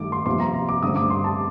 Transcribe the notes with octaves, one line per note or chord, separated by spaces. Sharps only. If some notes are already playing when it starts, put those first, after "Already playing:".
Already playing: G2 D#3 A3 D6
C6
C3 F3 A#3 C6
A#5
A#5
D6
G2 D3 A3 C4 D#6
D6
C6
A5